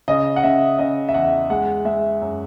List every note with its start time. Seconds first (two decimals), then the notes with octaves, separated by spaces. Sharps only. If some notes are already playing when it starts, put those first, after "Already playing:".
0.08 C#3 D#5
0.36 F#5
0.43 C#3 E5
0.79 C#3 D#5
1.09 E5
1.14 E2 F#5
1.50 G#3 F#5
1.85 G#3 E5
2.21 F#2